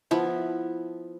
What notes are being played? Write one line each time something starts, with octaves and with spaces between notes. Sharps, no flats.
F3 B3 E4